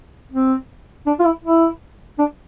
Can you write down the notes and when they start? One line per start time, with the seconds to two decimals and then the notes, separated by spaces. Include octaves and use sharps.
0.31 C4
1.06 D4
1.19 F4
1.25 E4
1.44 E4
2.18 D4